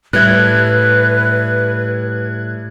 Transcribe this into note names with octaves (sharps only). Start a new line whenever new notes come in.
A2 G3 B4 E5 F#6 G#6